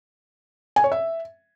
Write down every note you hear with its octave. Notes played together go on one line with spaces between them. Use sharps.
G#5
C#5
E5